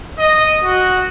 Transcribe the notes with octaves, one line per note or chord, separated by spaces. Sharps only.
D#5
F#4